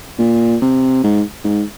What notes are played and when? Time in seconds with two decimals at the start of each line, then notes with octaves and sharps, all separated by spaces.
0.19 A#2
0.61 C3
1.03 G#2
1.44 G#2